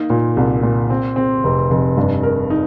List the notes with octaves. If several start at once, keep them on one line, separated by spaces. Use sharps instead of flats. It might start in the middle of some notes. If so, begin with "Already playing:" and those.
Already playing: A#3 D#4
A#2
C2
A#2
C4
C4
F1
F1
G2
A#4
D#4